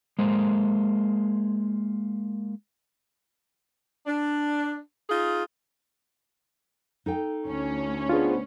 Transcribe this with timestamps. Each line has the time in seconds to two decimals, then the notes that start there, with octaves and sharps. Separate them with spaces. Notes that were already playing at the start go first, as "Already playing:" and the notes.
0.19 G#3 A#3 C5
4.06 D4
5.10 D#4 F4 G#4
7.06 D#4 A4 G5
7.47 D2 C#4
8.09 B3 D4 F4 G#4 C5